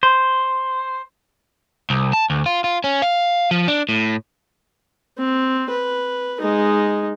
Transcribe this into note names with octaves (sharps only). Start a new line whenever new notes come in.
C5
C2
A5
D2
F4
F4
C#4
F5
F3
D4
A2
C4
B4
G#3 D#4